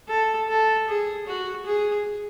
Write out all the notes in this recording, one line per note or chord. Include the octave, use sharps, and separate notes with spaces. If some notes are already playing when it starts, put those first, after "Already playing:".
A4
A4
G#4
F#4
G#4